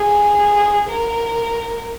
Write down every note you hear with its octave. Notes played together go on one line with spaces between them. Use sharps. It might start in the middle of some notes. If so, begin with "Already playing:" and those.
Already playing: G#4
A#4